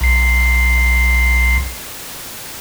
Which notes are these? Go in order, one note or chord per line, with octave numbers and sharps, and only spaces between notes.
B1 C7